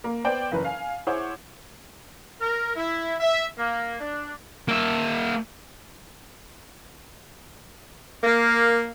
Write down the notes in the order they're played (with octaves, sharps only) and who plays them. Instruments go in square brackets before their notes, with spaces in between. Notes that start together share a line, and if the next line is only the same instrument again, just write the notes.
[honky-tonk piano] A#3
B3 C5 D5 G5
F#1 E3 B4 A#5
F5 G#5
E4 G#4 C5 C#5 F#5 D6
[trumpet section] A#4
E4
E5
A#3
D4
[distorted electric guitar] A#3 E5
[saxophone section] A#3